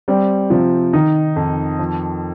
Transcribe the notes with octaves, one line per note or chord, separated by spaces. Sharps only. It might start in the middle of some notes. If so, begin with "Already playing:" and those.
G3 C4
C3 F3
D#3 D#4
F2
F3